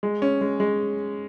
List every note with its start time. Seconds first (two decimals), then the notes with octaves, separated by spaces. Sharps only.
0.03 G#3
0.22 C#4
0.41 G#3
0.60 G#3